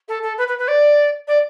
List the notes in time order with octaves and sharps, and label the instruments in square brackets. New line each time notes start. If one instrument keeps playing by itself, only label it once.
[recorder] A4
A4
B4
B4
B4
D5
D5